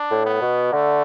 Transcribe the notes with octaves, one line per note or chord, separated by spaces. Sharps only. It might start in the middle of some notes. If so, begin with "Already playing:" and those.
Already playing: D4
A2
B3
B2
D3 A3